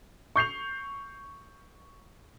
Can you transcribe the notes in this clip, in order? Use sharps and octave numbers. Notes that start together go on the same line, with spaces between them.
C#6 G6 C7 F7